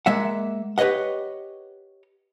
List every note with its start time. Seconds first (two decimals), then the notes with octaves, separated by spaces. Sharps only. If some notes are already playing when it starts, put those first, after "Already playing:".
0.06 G#3 A#3 E5 F#5
0.78 G4 B4 C#5 D#5 F#5